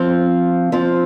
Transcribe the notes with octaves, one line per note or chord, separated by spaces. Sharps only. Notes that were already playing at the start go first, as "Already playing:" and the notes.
Already playing: F3 C4 F4
F3 C4 F4